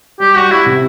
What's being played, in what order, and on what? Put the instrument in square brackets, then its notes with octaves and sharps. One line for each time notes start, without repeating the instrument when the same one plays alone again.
[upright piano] G3 [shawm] G4
[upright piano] G3 [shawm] F#4
[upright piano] G3 [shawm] E4
[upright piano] C3